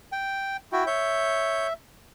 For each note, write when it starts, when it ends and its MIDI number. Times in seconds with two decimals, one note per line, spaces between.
0.12 0.57 79
0.72 0.85 64
0.72 0.84 66
0.72 0.85 79
0.87 1.67 73
0.87 1.73 76
0.87 1.67 91